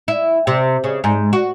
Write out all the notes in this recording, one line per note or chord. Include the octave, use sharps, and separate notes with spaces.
E4
C3
C#3
G#2
F#4